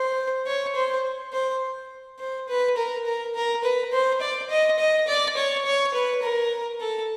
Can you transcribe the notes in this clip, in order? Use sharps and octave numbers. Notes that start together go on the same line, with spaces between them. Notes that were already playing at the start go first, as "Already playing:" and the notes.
Already playing: C5
C#5
C5
C5
C5
B4
A#4
A#4
A#4
B4
C5
D5
D#5
D#5
D5
C#5
C#5
B4
A#4
A4